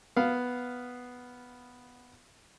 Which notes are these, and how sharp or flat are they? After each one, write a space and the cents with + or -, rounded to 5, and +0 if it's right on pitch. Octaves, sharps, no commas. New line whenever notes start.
B3 +0 F5 +0